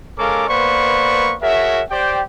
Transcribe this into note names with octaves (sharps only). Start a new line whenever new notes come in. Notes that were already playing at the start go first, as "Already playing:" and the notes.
G#3 C#4 A4 A#4 F5 D6
A#3 B3 B4 C5 D5 C#6
F#4 G#4 A#4 C#5 E5
G4 C5 D5 G5